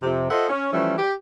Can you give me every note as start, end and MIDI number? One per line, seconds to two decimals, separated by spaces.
0.03 0.30 41
0.03 0.30 48
0.30 0.47 65
0.30 0.47 69
0.30 0.47 72
0.30 0.47 75
0.30 0.47 76
0.30 0.47 78
0.49 0.68 61
0.73 0.97 52
0.73 0.97 53
0.73 0.97 55
0.73 0.97 57
0.73 0.97 61
0.98 1.12 67